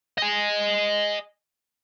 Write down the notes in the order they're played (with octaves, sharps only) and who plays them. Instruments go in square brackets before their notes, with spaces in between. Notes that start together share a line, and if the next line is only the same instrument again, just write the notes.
[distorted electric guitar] D#5 G#5